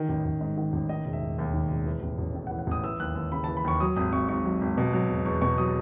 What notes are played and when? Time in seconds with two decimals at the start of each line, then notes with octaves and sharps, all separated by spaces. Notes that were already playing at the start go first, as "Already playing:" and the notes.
Already playing: D#3
0.09 A1
0.25 A1
0.41 G#2
0.57 D#3
0.73 A1
0.89 D#3 D#5
1.06 E1
1.13 E5
1.22 E1
1.38 D#2
1.54 D#3
1.71 E1
1.86 E3
2.02 A1
2.18 A1
2.35 A2
2.47 F#5
2.51 E3
2.59 F#5
2.67 A1 D#6
2.83 E3 E6
3.00 D#2 F#6
3.15 D#2 E6
3.32 C#3 B5
3.44 E3 A5
3.57 B5
3.64 D#2 C#6
3.80 F#3 D#6
3.96 G#1 D#6
4.12 G#1 C#6
4.28 G#2 C#6
4.45 F#3
4.61 G#1
4.78 B2
4.93 F#3
5.09 E1
5.25 E2 C#6
5.42 B2 C#6
5.58 F#3 D#6